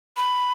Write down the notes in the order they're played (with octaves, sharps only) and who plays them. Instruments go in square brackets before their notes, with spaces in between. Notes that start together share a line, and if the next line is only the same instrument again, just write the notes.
[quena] B5